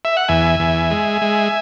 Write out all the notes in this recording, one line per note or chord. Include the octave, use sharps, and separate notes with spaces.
E5
F#5
E2 E5 G#5
E2
G#3
G#3